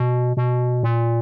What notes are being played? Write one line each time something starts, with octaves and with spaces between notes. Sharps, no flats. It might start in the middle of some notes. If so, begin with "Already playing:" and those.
Already playing: B2
B2
A#2